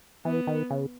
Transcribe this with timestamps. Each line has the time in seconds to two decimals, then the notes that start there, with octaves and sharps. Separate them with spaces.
0.25 E3 B3
0.47 D#3
0.70 C#3